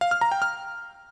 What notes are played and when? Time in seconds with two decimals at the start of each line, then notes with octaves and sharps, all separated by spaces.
0.01 F5
0.11 F6
0.21 A#5
0.32 G5
0.42 F6